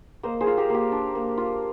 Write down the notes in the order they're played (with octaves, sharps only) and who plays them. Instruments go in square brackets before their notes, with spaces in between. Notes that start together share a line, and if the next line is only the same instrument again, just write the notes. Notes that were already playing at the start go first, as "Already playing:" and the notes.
[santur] A#3 C5 D#5
G#4 C5
F4
G4 A#4
A#3 G4
D4
A#3
F4